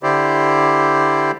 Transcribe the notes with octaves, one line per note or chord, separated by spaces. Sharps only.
D3 E4 G4 C5 D5